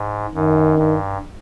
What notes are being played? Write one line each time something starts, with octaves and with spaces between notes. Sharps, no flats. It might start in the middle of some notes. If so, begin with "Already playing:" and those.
Already playing: G#2
F#2 D#3
G2